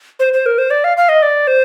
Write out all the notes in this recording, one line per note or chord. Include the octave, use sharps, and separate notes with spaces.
C5
C5
A#4
C5
D5
F5
F5
D#5
D5
C5